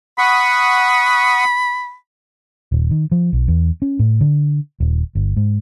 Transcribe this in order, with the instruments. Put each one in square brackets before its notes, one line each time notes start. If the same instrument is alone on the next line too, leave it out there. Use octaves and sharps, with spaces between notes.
[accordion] F#5 C#6 D#6 [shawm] B5
[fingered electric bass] D#1
D#3
F3
B1
E2
C#4
A2
D3
D#1
G1
G#2